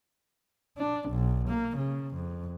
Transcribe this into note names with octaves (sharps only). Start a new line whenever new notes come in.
D4
B1
A#3
C#3
F2